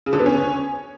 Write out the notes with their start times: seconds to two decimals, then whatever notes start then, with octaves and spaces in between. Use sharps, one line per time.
0.06 C#3
0.13 D3
0.19 B3
0.26 C#4